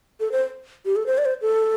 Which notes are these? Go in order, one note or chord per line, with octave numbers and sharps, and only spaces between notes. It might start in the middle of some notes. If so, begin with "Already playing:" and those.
A4
C5
G4
A4
C5
D5
C5
A4